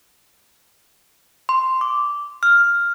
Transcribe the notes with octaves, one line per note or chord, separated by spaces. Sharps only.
C6
D6
F6